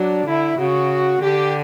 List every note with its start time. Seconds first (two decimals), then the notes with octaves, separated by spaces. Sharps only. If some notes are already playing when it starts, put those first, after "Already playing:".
Already playing: F#3 D4
0.26 D3 E4
0.58 C#3 F#4
1.22 D3 G4